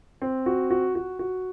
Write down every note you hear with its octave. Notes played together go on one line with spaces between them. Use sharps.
C4
F#4
F#4
F#4
F#4